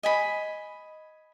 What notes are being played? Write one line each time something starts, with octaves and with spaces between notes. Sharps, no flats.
D#5 G#5 B5